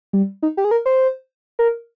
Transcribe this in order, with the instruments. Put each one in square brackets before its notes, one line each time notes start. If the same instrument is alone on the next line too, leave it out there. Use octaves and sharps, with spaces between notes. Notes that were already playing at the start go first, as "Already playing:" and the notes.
[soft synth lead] G3
D#4
G4
G#4
A#4
C5
A#4